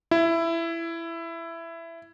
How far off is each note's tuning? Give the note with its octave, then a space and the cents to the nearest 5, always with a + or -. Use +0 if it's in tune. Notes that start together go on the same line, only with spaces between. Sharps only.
E4 +15